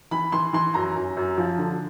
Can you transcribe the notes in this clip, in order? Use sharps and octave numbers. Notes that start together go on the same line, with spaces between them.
E3 B5
E3 C6
E3 C6
F#2 A#5
F#2
F#2
F3
D3